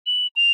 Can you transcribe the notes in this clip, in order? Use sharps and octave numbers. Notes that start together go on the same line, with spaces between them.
F#7
F7